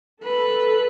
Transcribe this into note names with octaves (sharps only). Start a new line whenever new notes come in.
A4 B4